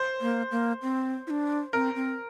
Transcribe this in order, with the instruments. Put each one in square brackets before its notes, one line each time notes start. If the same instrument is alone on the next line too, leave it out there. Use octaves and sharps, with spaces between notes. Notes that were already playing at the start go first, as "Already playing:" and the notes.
Already playing: [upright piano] C5
[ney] A#3
A#3
C4
E4
D4
[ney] C4 [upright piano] A#4
[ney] C4